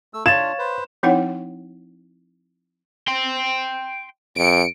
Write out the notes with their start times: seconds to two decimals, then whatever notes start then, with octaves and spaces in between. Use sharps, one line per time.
0.14 A3 E6
0.26 D4 F4 C#5 F5 G#6 A6 E7
0.58 B4 C5
1.03 F3 C4 D#4 E4 C#5 F#5
3.08 G5 C6
4.37 F2 C#7 D7